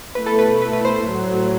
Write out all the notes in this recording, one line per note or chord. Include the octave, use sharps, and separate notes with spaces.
B2 A3 E4 B4
A4
B4
B4
B4
C5
C5
A2 F#3 A3